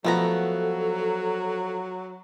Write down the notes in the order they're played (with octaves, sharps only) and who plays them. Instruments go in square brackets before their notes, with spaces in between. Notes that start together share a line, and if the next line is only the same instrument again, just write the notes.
[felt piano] F3 [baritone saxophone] F#3 [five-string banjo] A3 B3 A#5 [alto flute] A4